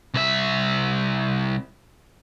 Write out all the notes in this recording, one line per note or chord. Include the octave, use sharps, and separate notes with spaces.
C2 E5